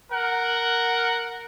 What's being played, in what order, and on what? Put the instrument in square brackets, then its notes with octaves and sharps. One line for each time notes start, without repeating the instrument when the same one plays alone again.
[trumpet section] A#4 F#5